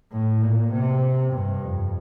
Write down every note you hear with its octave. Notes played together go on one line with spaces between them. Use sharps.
A2
A#2
C3
G2
F2